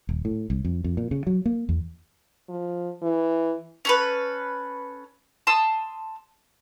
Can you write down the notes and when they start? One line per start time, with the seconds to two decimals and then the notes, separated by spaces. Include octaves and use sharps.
0.09 D#1
0.25 A2
0.50 C2
0.65 F2
0.84 F2
0.97 A#2
1.11 C#3
1.27 F#3
1.46 A#3
1.69 E2
2.49 F3
3.02 E3
3.85 C#4 A4 B4
5.47 A5 C6 D#6 E6